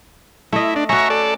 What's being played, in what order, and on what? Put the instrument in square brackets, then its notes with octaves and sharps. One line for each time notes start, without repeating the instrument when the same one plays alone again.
[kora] A3 D#5 [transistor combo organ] E4
[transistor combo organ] D4
[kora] C#4 F#4 [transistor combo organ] E5 A#5 C#6
[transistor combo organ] A4 D5